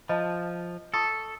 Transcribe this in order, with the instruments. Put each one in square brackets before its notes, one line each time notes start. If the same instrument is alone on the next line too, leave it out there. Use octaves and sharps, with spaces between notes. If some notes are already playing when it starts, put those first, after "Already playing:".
[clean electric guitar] F3 [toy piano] D#5 A5
[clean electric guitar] A4 [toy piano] A5 C#6 D#6